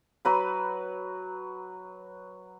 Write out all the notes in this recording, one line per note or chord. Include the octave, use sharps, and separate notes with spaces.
F#3 B4 B5